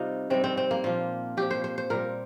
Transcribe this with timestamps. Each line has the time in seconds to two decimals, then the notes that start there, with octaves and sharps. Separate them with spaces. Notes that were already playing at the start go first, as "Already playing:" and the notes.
Already playing: C3 G3 D#4 F4
0.30 C3 G3 C4
0.44 C4
0.57 C4
0.71 A#3
0.84 A#2 F3 F4
1.37 A#2 F3 G4
1.51 C5
1.64 C5
1.78 C5
1.90 A#2 G3 A#4